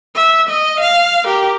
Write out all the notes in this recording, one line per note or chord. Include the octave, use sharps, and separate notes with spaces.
E5
D#5
F5
G4 A#4